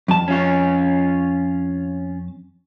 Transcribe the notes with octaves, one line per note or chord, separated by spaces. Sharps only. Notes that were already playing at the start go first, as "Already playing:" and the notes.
F2 A5
C#4 F4 C#5